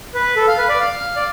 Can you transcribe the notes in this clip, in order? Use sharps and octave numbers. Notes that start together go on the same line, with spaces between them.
B4
A4
F5
B4
D5
F5
D5